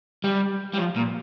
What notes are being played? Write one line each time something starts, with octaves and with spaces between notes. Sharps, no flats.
G3
G3
F3
A#2